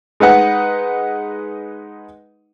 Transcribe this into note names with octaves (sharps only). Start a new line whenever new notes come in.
G#3 D#4 B4 F#5